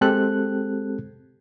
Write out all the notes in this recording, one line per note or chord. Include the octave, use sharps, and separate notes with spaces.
G#3 C4 G4 A4 F#6